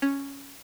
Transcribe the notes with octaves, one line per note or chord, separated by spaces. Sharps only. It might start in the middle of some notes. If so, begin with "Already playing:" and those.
C#4